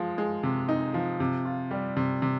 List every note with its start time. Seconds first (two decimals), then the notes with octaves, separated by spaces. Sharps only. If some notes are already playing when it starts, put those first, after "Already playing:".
Already playing: F3 G#3
0.18 G#3
0.43 C3
0.69 D#4
0.94 F3
1.20 C3
1.45 F4
1.71 G3
1.97 C3
2.22 C3